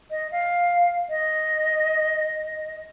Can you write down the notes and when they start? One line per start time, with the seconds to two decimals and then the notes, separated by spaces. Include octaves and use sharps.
0.11 D#5
0.32 F5
1.09 D#5